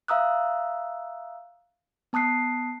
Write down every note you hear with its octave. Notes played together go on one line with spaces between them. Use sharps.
E5 F5 A#5 D#6 E6 F#6
B3 A5 D#6 F#6 C7